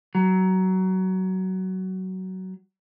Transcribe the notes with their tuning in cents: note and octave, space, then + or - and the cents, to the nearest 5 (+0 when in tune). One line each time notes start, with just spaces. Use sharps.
F#3 +20